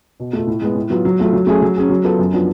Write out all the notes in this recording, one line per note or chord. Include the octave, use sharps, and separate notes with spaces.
B2
A3 F4
A2
G#3 B3
A2
F#3 B3 F4
F#3
A3 F4
F#3
A3 C#4 G#4
F#3
C#4 G#4
F#3
B3 F4 A4
F#2
F3 B3 D4 F#4